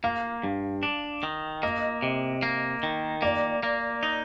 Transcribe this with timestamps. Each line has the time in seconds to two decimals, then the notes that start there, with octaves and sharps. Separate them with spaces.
0.04 A#3 F5
0.43 G2
0.83 D4
1.23 D#3
1.63 A#3 D#5
2.02 C3
2.43 A#3
2.83 D#3
3.22 A#3 D5
3.63 A#3
4.03 D#4